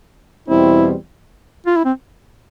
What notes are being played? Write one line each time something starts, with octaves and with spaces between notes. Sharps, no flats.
E2 B2 G3 C4 E4
F4
E4
C4